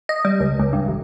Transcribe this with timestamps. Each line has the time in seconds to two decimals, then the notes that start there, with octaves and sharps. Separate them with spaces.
0.09 D#5
0.25 G3
0.40 C#2
0.59 C#2
0.73 G2
0.88 A1